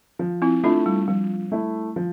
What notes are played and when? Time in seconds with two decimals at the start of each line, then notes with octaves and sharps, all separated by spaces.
0.19 F3
0.42 C4 E4
0.63 A3 D4 E4 F4
0.86 G3
1.08 F3 G3
1.52 A3 E4
1.96 F3